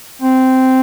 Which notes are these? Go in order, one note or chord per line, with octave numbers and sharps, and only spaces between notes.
C4